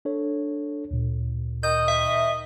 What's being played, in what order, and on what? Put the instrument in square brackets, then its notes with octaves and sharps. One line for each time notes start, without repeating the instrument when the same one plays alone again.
[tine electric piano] D4 A4 C#5
D2 A#2
[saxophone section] D#3 D#5 [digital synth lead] G6
[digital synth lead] E5